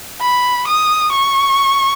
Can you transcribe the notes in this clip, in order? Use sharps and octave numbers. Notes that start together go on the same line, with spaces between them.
B5
D#6
C#6